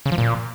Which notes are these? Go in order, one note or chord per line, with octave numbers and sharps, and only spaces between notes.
C#3
F3
A#2